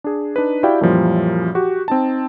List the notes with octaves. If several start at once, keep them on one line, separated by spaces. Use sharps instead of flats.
D4 G#4
D4 D#4 B4
E4 F#4 G4 D5 F5 G5
F#2 A#2 E3 F3 G3
F#4 G4
C4 D#4 A5